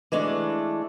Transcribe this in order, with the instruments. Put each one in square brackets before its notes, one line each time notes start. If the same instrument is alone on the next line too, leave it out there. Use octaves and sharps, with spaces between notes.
[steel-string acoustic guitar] E3 G#3 A3 D4